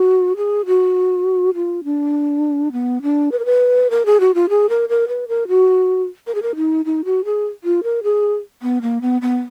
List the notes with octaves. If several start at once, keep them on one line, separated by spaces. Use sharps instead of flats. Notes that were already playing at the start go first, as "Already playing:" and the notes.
Already playing: F#4
G#4
F#4
F4
D4
B3
D4
B4
A#4
B4
A#4
G#4
F#4
F4
G#4
A#4
A#4
B4
A#4
F#4
A#4
G#4
A#4
D#4
D#4
F#4
G#4
F4
A#4
G#4
B3
A#3
B3
B3